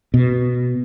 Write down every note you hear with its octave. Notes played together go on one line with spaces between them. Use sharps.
B2